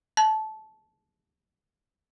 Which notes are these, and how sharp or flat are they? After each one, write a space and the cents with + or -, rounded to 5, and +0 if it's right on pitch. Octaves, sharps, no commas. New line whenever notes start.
A5 -20